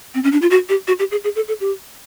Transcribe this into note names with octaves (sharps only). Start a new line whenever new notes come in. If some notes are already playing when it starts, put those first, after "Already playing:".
C4
C#4
D4
F4
F#4
G4
F#4
G4
G#4
G#4
A4
A4
G4